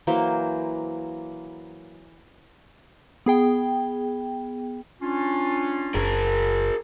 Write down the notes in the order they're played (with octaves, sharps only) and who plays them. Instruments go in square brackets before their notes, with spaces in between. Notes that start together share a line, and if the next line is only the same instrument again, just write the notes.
[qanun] E3 F#3 A#3 C5
[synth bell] B3 G#4 G5
[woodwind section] C#4 D4 F4
[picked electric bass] F#1 [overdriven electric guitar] G#4 A#4